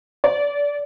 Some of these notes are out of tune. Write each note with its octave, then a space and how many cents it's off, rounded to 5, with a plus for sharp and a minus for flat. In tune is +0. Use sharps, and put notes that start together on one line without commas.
D5 -20